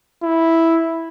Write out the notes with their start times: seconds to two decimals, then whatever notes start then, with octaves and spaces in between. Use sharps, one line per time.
0.23 E4